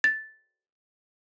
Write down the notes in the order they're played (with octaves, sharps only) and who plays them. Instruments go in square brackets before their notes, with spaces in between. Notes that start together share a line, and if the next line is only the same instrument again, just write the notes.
[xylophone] A6